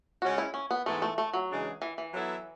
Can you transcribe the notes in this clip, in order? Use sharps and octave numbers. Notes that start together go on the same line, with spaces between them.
C#3 G#3 C#4 F#4
E4
C#4
B3
G#2 E3 A3 B3 E4 A4
A3
A3
F#3
C#3 E3 G#3 D4 G#4
E3
E3
F#3 B3 E4 A4 E5